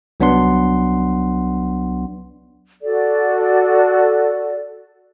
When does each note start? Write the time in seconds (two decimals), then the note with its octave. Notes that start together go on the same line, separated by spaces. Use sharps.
0.20 C2 F#3 B3 D4 F#5 C6
2.83 F#4 A4 D5